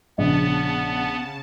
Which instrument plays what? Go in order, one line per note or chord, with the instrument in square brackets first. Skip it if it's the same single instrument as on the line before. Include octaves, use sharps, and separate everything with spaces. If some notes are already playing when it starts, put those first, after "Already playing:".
[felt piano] A#1 [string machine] C#3 A5 [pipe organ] B3